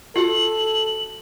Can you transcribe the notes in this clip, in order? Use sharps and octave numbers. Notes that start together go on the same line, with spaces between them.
F4 F#4 A4 F#7